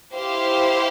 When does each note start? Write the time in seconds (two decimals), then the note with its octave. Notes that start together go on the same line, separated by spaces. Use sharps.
0.14 E4 G4 C5 F5